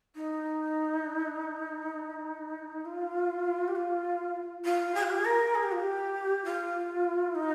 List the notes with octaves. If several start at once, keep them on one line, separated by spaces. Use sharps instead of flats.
D#4
F4
G4
F4
F4
G#4
F4
G4
G#4
A#4
G#4
G4
F4
G4
F4
D#4